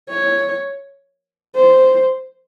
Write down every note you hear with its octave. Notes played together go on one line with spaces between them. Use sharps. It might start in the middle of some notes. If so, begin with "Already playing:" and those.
C#5
C5